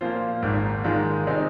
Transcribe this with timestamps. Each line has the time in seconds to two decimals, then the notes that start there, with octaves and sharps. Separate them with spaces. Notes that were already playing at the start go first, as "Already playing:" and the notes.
0.01 A#2 F3 A#3 F4 C5
0.42 G#1 G#2 D#3 A#3
0.84 G#2 D#3 G#3 F4 A#4
1.27 C3 G#3 C4 D#4